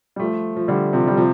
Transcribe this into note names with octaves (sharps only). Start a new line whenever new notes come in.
G3
F3 A3
F3
D3 G3
C3 F3
G3
C3 F3